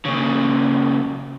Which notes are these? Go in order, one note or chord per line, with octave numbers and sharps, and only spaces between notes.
A#2 C#3